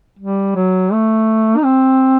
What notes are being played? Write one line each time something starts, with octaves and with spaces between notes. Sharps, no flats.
G3
F#3
A3
D#4
C4